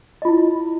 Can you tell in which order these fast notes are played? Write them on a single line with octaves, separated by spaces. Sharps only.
D#5 F4 E4